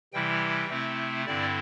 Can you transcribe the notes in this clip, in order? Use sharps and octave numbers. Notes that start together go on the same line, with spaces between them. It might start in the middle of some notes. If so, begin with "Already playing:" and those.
C3 E3 G3 E4 G5
C3 A3 C4 E4
G2 D3 C4 E4 D5